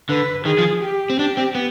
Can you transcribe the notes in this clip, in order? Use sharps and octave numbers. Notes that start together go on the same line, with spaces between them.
D3 B4
D#3 G#4
F3
G4
C4
D4 G4
C4
B3